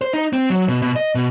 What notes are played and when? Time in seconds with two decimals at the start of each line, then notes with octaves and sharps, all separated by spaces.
0.01 C5
0.13 D#4
0.33 C4
0.50 F#3
0.68 B2
0.82 B2
0.96 D#5
1.15 B2